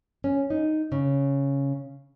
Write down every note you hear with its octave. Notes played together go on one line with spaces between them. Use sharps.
C#4
D#4
C#3